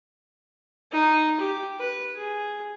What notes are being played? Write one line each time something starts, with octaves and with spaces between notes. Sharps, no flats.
D#4
G4
B4
G#4